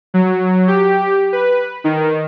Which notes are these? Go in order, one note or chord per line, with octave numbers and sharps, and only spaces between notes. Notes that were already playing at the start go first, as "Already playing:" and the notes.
F#3
G4
B4
D#3